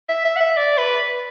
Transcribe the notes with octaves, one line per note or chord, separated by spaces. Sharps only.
E5
E5
F#5
E5
D5
B4